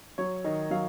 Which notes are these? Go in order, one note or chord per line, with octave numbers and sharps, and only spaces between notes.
F#3 C#5
D#3 D#5
F#3 F5